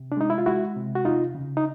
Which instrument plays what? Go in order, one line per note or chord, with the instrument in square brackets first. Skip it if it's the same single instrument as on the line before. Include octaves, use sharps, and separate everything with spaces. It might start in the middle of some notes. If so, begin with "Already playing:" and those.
Already playing: [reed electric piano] C3
D4
G#3 D#4
E4
F4
G#3 E4 F#4
C3
F#4
E2 D#4 F4
C#3
D#4